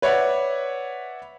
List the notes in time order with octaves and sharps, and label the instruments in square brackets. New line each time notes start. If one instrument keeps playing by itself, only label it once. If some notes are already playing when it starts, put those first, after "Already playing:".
[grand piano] B4 C#5 D5 E5 F#5